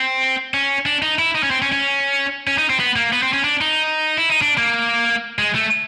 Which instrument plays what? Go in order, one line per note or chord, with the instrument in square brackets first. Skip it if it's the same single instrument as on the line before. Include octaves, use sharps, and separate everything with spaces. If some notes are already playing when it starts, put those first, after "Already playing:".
Already playing: [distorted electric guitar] C4
C#4
D4
D#4
E4
D#4
C#4
C4
C#4
C#4
C#4
D#4
C4
B3
A#3
B3
C4
C#4
D4
D#4
E4
D#4
D4
A#3
G#3
A3